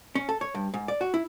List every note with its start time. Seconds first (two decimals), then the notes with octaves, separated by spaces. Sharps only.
0.15 C#4
0.29 A4
0.41 C#5
0.55 G2
0.74 G#2
0.88 D5
1.01 F#4
1.14 E4